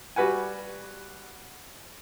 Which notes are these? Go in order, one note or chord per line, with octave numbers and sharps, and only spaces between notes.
G3 F#4 B4 F#5 G#5